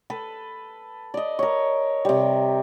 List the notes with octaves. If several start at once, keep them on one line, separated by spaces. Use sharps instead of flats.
A4 B4
D5 D#5
A#4 C#5
C3 G3